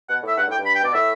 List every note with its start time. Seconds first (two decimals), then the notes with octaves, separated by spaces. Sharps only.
0.09 B2 F#5
0.23 A2 E5
0.37 G2 F#5
0.48 A2 G5
0.58 G2
0.65 B5
0.75 G5
0.83 B2 D5
0.94 A2 E5